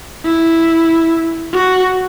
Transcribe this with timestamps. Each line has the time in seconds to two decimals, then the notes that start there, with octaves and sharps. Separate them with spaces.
0.25 E4
1.53 F#4